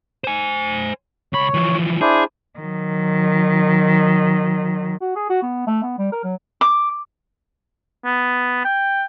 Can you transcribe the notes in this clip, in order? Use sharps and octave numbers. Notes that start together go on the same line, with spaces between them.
C5 G#5
C#2 C#5 B5
E3 F3
D4 E4 G#4 C5
D#3 F#3
F#4
G#4
F#4
B3
A3
B3
G3
A#4
F#3
D6
B3
G5